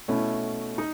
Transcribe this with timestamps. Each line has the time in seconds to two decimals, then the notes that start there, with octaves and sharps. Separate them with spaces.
0.08 B2 A3 C#4 E4
0.78 D#4